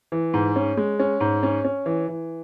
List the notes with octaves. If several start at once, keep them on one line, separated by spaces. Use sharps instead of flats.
E3
G#2
C#4
G#3
C#4
G#2
C#4
C#4
E3
E3